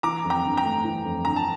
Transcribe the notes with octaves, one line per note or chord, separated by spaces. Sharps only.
E3 A#5 D6
F2
G5 A#5
G1
G5 A#5
A3
E3
F2
G1 A#5
A5